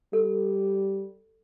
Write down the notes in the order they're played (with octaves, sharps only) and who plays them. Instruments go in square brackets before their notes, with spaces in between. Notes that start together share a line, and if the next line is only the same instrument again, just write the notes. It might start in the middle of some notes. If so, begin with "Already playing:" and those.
[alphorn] G3 [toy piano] A4